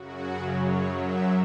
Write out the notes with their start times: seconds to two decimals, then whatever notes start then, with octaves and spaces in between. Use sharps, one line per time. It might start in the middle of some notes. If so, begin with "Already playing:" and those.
Already playing: F#2 C#3 F#3 F#4
0.61 F#2 F#3 C#5
0.98 E5